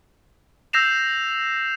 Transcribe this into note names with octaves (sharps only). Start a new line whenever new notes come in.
E6 G6 A#6 C7 E7 F7